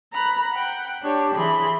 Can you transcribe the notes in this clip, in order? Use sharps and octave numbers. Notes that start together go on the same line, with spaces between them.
A#5 B5 F#6
F#5 G5
D4 G4 C#5
E3 G#4 B5 C6